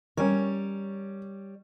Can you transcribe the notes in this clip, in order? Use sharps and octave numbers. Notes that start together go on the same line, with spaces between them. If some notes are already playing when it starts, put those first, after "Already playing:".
G3 C#4 A#4 C#5